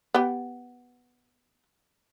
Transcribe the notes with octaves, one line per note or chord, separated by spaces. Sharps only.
B3 G4